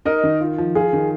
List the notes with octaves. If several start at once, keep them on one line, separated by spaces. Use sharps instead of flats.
D#4 A#4 D#5
D#3
F4
F3
F4 G#4
D#3